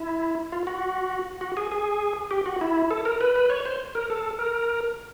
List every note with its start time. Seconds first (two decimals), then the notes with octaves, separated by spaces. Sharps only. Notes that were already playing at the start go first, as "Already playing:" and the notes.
Already playing: E4
0.52 F4
0.67 F#4
1.41 F#4
1.57 G#4
1.72 G#4
2.31 G4
2.46 F#4
2.61 E4
2.91 A4
3.05 A#4
3.21 B4
3.36 B4
3.50 C#5
3.65 C5
3.95 A#4
4.10 A4
4.39 A#4